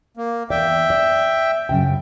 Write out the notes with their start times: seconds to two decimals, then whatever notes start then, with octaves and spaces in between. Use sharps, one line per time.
0.17 A#3
0.50 E2 D5 E5 G5
0.90 D5
1.69 F#2 C#3 G5